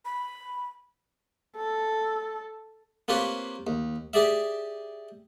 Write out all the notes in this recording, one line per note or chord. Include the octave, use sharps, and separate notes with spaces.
B5
A4
A#3 C4 F4 G4 B4 C#5
D#2
G4 G#4 D5 E5